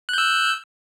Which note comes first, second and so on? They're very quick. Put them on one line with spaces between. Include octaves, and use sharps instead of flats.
F#6 G6 E6